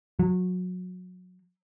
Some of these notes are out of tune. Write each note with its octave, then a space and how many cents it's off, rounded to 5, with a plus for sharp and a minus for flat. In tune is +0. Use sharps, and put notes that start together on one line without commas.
F#3 -25